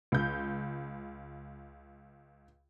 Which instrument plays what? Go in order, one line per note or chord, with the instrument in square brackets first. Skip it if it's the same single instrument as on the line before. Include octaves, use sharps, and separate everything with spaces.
[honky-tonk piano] C#2 G6